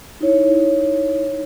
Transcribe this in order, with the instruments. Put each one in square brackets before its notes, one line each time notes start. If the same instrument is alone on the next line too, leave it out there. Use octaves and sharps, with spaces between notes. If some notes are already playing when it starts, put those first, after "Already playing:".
[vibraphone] D#4 E4 C#5